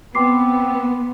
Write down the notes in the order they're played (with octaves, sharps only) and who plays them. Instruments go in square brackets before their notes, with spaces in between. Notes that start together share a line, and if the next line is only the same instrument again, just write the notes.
[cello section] B3 [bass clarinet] C4 [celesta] C6 D6 C7